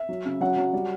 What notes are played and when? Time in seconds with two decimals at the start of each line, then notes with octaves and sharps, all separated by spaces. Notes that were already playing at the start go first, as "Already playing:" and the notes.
Already playing: E5
0.09 F#3
0.25 C#3
0.41 F#3 F#5
0.57 F#3
0.73 G3